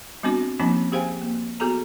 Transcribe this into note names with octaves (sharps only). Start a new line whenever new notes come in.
G3 B3 C4 D4 F#4
F3 G3 A#3 C4 C#4 D#4
G4 G#4 C5 F5 G5 G#5
A#3
B3 F#4 G#4 A4 A#5